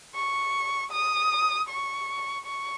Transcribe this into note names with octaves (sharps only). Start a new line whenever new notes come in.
C#6
D#6
C#6
C#6